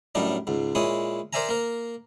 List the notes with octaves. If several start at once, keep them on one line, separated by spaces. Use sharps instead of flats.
F#2 A2 G3 D4 D#4
C#2 G#2
A#2 G#3 E4 C#5 D#6
A#4 C5 D5 E5 G#5 A#5
A#3 A#4